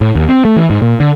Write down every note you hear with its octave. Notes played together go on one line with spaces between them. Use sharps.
A2
D#2
C4
A3
E3
G#2
A#2
D3